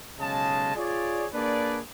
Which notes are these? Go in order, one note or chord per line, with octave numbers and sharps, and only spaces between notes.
B1 C#3 G#3 D#5 A5
F4 G#4 C#5 D5
A#3 D4 G#4 B4 D5